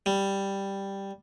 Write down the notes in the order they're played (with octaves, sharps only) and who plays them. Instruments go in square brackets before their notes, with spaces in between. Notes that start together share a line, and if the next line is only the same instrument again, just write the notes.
[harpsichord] G3